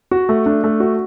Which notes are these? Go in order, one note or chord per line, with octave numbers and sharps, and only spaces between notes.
F#4
A3
D4
A3
F#4